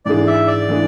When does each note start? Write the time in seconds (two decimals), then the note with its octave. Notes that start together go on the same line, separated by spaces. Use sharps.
0.05 G#2 E3 G#3 D4 G#4 D5
0.27 E5
0.48 D5
0.69 E3 G#3 D4 G#4